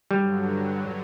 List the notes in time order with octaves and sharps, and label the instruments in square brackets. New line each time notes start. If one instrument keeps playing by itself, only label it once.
[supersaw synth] G2 D3 F#3 [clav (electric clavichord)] G3